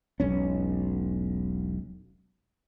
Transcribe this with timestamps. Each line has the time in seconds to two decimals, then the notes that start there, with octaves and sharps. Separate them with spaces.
0.20 E1 B1 C#4